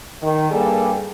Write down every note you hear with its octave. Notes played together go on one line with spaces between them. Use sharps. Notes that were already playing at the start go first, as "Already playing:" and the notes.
D#3
G2 G3 A#3 G#4 A4